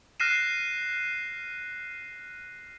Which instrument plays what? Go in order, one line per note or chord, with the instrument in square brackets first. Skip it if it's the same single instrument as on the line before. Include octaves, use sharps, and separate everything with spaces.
[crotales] F6 F#6 A#6 C7 D#7 E7